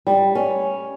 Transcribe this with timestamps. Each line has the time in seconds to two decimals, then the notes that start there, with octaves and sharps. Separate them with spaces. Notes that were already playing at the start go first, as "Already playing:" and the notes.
0.07 G3
0.35 C#4